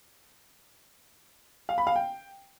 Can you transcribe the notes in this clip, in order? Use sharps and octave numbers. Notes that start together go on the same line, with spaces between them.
F5
B5
F5
G5